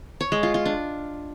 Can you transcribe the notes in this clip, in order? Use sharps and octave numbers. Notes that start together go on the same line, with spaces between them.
C#5
G#3
F4
F4
D4